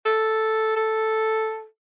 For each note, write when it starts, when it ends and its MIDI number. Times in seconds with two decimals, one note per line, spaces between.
0.05 0.74 69
0.76 1.64 69